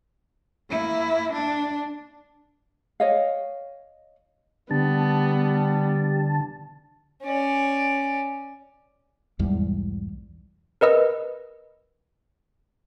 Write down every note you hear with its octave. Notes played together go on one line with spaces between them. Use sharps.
A#3 E4
D4
C#5 D#5 F5
D3 G3 B3 A5
C#4 D5
B1 E2 G#2 G3
A#4 B4 D#5 E6